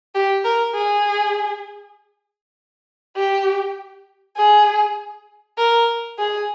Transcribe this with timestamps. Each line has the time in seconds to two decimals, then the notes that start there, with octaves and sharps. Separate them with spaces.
0.15 G4
0.45 A#4
0.75 G#4
3.16 G4
4.37 G#4
5.58 A#4
6.19 G#4